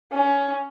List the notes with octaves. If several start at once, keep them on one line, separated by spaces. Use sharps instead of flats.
C#4